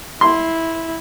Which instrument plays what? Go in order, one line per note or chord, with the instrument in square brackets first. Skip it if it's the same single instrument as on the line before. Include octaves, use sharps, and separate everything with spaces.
[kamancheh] E4 [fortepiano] C6